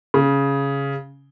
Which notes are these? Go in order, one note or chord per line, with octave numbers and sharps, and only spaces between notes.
C#3